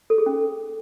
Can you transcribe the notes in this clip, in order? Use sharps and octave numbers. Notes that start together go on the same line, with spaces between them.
A4
G#4
C#4